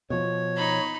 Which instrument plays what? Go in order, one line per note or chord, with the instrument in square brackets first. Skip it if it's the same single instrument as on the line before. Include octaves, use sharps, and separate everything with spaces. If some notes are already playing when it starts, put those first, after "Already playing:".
[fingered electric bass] B2 F3 [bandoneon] C#5
[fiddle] D#4 B5